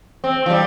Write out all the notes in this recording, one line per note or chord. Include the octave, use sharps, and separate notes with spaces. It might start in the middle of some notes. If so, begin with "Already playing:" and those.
C4
F3
G3